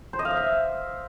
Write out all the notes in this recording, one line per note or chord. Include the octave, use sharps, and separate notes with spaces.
C5
D#5
F5
D#5
E5